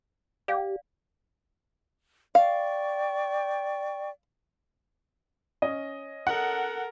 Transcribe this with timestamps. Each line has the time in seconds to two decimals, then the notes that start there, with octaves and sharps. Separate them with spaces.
0.48 G4 D5 F5
2.35 D5 F5 G5 C#6
5.62 C#4 D#5
6.27 A4 A#4 F#5